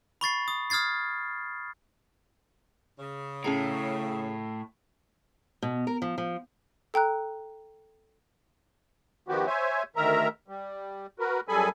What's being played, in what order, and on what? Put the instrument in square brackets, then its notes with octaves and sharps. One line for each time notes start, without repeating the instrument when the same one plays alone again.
[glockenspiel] B5 C#6 A6 C7
D#6
D#6 F6 G#6 A6 C7
[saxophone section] C#3
[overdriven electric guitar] A2 [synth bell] C#4 G#4 A#5
[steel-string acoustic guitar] B2
A#4
F3
F3
[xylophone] A4 G5 A#5 F#6
[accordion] D#3 F3 B3 F#4 G4
C5 C#5 E5 G#5
D2 D#3 A#4 E5 A#5
G3
F#4 A#4 B4
F#2 G3 G#4 A4 G#5 B5